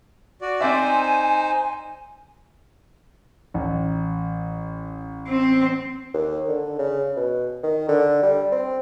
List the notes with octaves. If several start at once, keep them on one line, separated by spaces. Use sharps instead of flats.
F#4 D5
C4 D#4 C5 D5 E5 G#5
A1
C4
D#2
D3
C#3
B2
D#3
D3
G3
C4